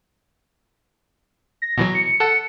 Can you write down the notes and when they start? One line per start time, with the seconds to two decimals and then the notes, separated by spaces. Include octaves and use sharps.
1.62 A#6
1.78 B2 E3 F#3
1.95 C#7
2.20 A4 F#5 A5